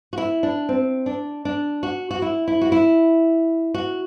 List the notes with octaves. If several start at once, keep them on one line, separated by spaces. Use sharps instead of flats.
F#4
E4
D4
C4
D4
D4
F#4
F#4
E4
E4
F#4
E4
F#4